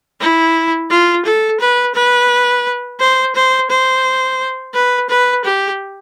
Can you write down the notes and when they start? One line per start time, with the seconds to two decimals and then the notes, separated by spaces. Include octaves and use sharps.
0.20 E4
0.90 F4
1.25 A4
1.60 B4
1.95 B4
3.00 C5
3.35 C5
3.70 C5
4.74 B4
5.09 B4
5.44 G4